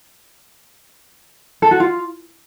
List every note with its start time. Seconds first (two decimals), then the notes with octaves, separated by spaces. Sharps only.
1.62 A4
1.71 F#4
1.80 F4